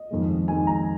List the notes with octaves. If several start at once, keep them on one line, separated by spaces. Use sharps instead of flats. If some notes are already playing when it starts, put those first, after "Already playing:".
Already playing: D#5
F2 D#3 G#3
F2 D#3 G#3 G#5
A#5